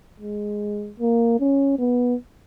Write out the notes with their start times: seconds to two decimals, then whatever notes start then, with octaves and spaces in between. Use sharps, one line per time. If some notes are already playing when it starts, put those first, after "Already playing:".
0.20 G#3
1.00 A#3
1.40 C#4
1.79 B3